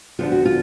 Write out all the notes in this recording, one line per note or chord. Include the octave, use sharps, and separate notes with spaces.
D2 D3 F3 B3 F4
F#4
F4